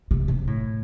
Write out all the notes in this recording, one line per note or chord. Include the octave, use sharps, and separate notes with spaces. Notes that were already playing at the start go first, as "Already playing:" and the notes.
C3
C3
A2